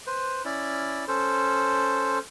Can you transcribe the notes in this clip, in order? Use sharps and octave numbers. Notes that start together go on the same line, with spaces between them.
B4 C5
C#4 E4 D5
C#4 A4 C5